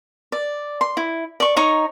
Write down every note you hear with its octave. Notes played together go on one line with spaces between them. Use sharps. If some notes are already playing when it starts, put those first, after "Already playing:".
D5
C6
E4
D5 C#6
D#4 C#5 A#5 C#6